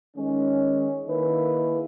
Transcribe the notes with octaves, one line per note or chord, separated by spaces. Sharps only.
D#3 G#3 C#4
D#3 A#3 E4 G#4 B4